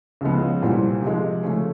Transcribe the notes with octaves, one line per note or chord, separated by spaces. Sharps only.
C#2 C#3 F3 G#3 B3
C2 A#2 G3 C4
C3 F3 G#3
C#3 F3 A3 C#4